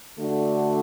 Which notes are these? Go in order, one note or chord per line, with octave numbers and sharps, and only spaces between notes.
D3 A3 D4 F#4